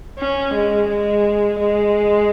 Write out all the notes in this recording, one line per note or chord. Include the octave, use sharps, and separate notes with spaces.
C#4
G#3
G#3
G#3